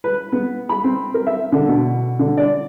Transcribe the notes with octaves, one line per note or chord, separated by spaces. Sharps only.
B4
B3
B5
C4
A#4
E5
D3
B2
D3
D5